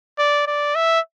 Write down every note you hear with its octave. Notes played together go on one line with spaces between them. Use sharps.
D5
D5
E5